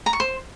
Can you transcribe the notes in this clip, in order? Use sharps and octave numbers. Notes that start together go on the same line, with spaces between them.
A#5
C#6
C5